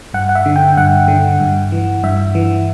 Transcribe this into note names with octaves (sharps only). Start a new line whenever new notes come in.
G2 F#5
F#5
E5
D3
G5
G2 F#5
D3
G2
E3
G2 E5
E3